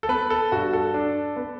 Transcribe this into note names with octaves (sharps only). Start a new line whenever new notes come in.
A4
B3 B4
A4
G2 F#4
A4
D4
B3